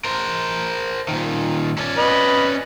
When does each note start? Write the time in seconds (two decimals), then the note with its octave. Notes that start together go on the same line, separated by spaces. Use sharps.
0.05 A#4 C5
1.08 A#2 D#3
1.78 C#4 D5
1.98 B4 D#5